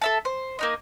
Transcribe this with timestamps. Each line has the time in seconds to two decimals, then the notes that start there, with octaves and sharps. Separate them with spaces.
0.02 A4 E5 A5
0.25 C5
0.59 A#3 D#4 D#5